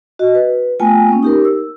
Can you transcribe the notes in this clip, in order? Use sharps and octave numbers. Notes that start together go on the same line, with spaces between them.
F#4 D#5
B4
A3 B3 F4 G5 G#5
A#3 B3 C#4
D#4 G4 A#4
E6